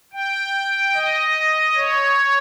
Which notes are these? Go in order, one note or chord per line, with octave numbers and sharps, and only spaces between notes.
G5
D#5
C#5